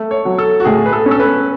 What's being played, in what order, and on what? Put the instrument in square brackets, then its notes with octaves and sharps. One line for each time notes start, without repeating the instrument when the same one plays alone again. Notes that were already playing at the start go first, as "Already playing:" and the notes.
Already playing: [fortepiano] A3
[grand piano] C#5
[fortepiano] F#3
[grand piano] A4
F#4
[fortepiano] A2 [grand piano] G#4
[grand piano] B4
A4
[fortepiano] C#4
[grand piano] A4
B4